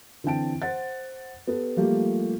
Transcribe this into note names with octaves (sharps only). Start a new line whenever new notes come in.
D3 E3 C4 G5 A5 D7
C5 F#5 A6
B3 G4 A4
F3 G3 A3 A#3 F4 G4